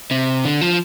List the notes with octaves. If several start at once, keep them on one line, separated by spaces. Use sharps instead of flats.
C3
D3
F3